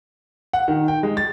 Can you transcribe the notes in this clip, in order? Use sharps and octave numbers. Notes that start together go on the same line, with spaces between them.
F#5
D#3
G5
G#3
A6